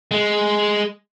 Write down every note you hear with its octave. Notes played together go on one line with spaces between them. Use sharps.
G#3